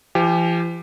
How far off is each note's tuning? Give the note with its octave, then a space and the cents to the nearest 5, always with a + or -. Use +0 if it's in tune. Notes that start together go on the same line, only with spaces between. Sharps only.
F3 -45 G4 +15